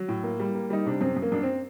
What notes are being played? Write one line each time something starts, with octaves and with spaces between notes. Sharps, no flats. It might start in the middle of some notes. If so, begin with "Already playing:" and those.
Already playing: F#3
A2
A#3
G3
A#3
G3 D#4
C3 D4
F#2 C4
F#2
A#3
F#2 D4
C4